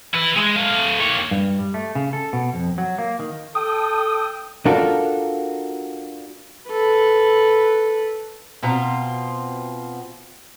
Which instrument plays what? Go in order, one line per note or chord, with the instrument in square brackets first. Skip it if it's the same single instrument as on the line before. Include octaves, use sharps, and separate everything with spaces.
[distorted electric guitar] E4 B4
G#3
A3 F5
A#3 C#5
[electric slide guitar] G2
G3
A3
C#3
A4
B2
F2
F#3
A#3
D#3
[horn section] A4 G5 [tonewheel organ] D#6
[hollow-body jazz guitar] D4 F4 F#4 A4 A#4
[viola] A4 B4
[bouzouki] B2 C4 F4 A#5